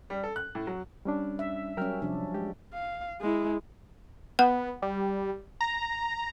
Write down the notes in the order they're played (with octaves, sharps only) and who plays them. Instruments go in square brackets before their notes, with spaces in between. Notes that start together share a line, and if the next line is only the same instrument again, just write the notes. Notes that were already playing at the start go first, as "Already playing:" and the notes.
[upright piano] G3
A4
F#6
A2
F#3
[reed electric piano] G3 C#4 D4
[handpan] E5
[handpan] F#3 G3 C#4 [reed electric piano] A#4 G5 F6
[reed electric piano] C3 [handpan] F3 D4
[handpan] G#3 [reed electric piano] G4
[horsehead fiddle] F5
G#3 E4
[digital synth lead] B3 [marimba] F#5
[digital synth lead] G3
A#5